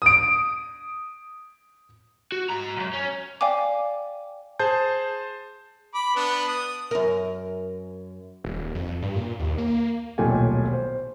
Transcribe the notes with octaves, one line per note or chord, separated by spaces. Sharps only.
D#6 D7
F#4
G#2 A#5
C2 F#2
C#4
D5 F5 G5 G#5 D6
G#4 C5 A5 G6
B5 D6
B3 D4 B4
D#6
F#2 A#4
D#1
F2
G2
A#2
D#2
A#3
D#1 B1 A#2 A3 G5 G#5
C5